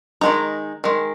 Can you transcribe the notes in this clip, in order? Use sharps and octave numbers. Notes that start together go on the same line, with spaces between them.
D#3 G#3 D#4 A#5
D#3 G#3